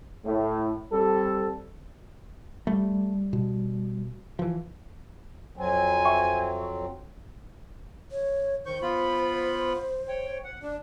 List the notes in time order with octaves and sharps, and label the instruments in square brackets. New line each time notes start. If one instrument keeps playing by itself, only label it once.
[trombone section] A2
G3 C4 A4
[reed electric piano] G3 [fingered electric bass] A3
[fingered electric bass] B2
E3 F3
[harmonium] F2 F#3 C4 [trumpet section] G#5
[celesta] E5 G5 C#6
[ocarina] C#5
[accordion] D#3 C#6 G6 [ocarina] C5
[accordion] B3 F4 B5
C#5 G5
F#5
[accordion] D4 [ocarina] D5